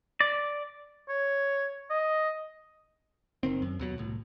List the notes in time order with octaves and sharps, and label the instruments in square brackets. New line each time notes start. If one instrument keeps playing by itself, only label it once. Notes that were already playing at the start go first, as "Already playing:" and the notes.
[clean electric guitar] D5
[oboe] C#5
D#5
[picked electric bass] F#1 D#3 C4
F#2
D#2 B2 F#3
C2 A2